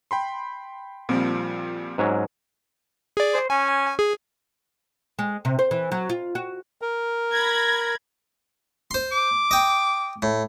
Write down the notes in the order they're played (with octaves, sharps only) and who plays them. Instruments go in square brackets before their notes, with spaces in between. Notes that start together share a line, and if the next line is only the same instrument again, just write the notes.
[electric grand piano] G5 B5 C6
[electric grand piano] A#2 F3 G3 [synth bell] C4 F4 D7
[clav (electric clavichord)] G#2 F#3 C#4
[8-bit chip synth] G#4 D5
[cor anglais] C5
[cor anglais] C#4 [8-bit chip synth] G#5
[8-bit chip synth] G#4
[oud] G#3
C3
C5
E3
F#3
F4
F#4
[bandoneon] A#4
[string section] B5 G#6 A#6
[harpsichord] C5 C6
[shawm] D6
[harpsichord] D#5 G5
A2